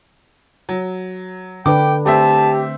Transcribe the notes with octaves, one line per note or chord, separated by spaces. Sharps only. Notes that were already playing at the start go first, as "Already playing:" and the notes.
F#3
D3 D4 B4 G5 D6
A3 C4 G4 E5 A5